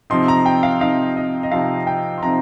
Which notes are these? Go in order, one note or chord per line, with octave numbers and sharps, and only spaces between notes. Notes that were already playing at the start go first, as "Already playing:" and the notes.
C3 F3 C4 D#4 C6
A#5
G5
F5
C3 F3 C4 D#4 F5
D#5
D#5
C3 F3 C4 D#4 F5
G5
C6
C3 F3 C4 D#4 A#5